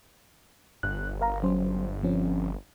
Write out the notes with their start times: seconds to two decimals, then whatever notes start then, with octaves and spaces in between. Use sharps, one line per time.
0.83 G1 F#6
1.21 A#4 F5 A#5
1.43 F#3 C#4 C5
2.03 F3 C4 C#4